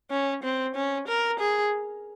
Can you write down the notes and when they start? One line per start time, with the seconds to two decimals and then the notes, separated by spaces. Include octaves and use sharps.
0.11 C#4
0.44 C4
0.75 C#4
1.08 A#4
1.40 G#4